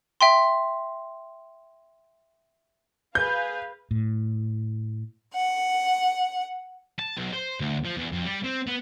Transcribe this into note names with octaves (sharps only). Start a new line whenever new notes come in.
E5 G5 C6
G#4 B4 F5 G6
A2
F#5
A5
B1
C5
D2
F3
E2
F2
G3
C4
B3